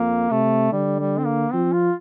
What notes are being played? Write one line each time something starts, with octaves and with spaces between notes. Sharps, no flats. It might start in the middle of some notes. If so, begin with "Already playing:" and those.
Already playing: F2 A#3
C3 A3
D3 G3
G3
C4
A#3
F3 C4
F4